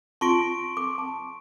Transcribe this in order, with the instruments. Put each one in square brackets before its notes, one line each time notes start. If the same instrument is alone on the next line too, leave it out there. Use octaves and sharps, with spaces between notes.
[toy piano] F4 A5 [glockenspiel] C6 C#6 D7
[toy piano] D6
A5